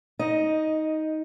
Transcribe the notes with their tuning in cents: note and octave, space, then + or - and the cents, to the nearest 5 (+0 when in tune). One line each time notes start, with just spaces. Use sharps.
D#4 +15 D#5 +0